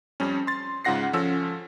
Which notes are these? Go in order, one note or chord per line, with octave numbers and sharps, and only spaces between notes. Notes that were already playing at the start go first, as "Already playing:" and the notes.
F2 G3 C#4
C6 A6
G#2 C#3 F4 F#5 A#6 C7
F3 C#4 A4 E6